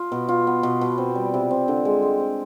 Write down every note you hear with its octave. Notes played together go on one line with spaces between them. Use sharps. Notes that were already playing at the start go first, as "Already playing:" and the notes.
Already playing: F4
B2
F4
B3
B2
B2
C4
G3
C3
C4
D3
G#3
G#3
C4